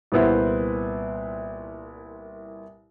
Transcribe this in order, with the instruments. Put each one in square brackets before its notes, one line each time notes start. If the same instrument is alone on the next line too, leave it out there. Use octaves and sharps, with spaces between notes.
[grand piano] C2 A#2 B3 E4 C5